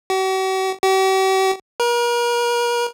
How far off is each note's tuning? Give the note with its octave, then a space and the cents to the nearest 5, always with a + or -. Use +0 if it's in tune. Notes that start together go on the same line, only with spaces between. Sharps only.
F#4 +45
G4 -45
A#4 +40